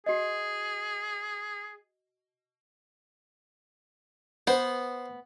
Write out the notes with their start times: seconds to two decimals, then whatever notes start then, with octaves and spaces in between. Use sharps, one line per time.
0.06 F#4 G#4 D#5
4.47 B3 C5